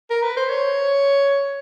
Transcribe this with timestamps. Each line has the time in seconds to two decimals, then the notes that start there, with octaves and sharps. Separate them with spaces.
0.10 A#4
0.23 B4
0.37 C5
0.49 C#5